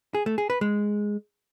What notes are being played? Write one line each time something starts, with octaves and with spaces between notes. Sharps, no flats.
G#4
A3
G#4
B4
G#3